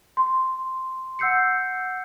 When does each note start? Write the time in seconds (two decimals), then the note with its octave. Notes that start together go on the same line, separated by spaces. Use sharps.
0.17 C6
1.19 F#5 E6 G6 C7 C#7